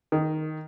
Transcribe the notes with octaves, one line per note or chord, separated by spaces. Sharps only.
D#3